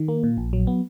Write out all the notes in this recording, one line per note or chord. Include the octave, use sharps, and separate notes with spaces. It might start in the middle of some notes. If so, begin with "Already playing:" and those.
Already playing: D#3
A#3
A#2
A#1
F#3
B3